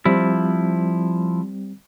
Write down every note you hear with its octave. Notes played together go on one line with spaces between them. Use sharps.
F3 G3 C4 E4